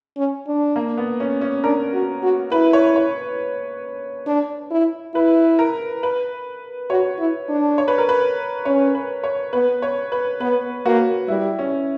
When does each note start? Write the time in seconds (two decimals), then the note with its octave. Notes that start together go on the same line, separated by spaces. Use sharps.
0.17 C#4
0.47 D4
0.76 A#3
0.97 B3
1.20 C#4
1.41 C#4
1.64 D4 A#4
1.93 F#4
2.23 F#4
2.52 E4 B4
2.73 C#5
2.96 C#5
4.26 D4
4.71 E4
5.14 E4 B4
5.59 A#4
6.03 B4
6.90 F#4 C#5
7.19 E4
7.49 D4
7.78 C#5
7.88 B4
7.98 A#4
8.09 B4
8.65 C#4 C#5
8.95 B4
9.24 C#5
9.53 B3 B4
9.82 C#5
10.12 B4
10.40 B3 B4
10.85 A#3 F#4
11.28 G3 E4
11.59 C#4